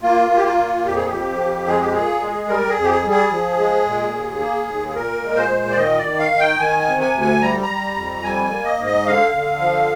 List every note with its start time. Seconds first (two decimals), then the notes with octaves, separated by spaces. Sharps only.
0.02 A#3 F4
0.31 A#3
0.36 G4
0.44 F4
0.58 A#2
0.85 F2 G4
0.96 G#4
1.06 G4
1.11 F3
1.40 F2
1.67 G#3 G#4
1.80 G4
1.92 A#2 G#4
2.21 G#3
2.48 G3 A#4
2.69 G#4
2.77 F2
2.84 G4
2.90 G#4
3.04 G3
3.10 G#4
3.31 F3
3.58 G#3
3.85 A#2
4.14 D#2
4.40 A#3
4.67 D#2
4.89 G#4
4.95 A#2 A#4
5.23 G#3
5.36 C5
5.50 A#2
5.70 D5
5.77 D#3 D#5
5.98 D5
6.04 D#3
6.19 F5
6.32 D#3
6.39 G5
6.60 D#3 G#5
6.80 G#5
6.86 C3
7.01 G#5
7.14 D2
7.21 G#5
7.41 G3 A#5
7.63 A#5
7.69 G3
7.96 F2
8.24 G3 G#5
8.44 G#5
8.51 A#3
8.64 D#5
8.78 G#2
8.86 D#5
9.06 D3 F5
9.33 D3
9.60 F3